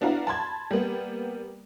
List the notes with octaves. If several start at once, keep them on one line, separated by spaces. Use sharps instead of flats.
B3 D4 E4 F#4 F5 A#5
A5 B5 C6 G#6
G3 A#3 B3